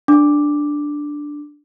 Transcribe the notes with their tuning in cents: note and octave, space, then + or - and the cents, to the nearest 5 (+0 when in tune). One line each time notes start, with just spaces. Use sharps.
D4 +0 D6 +0